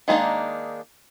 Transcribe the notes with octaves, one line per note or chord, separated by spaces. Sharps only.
D#3 G#3 A#3 D4 D#4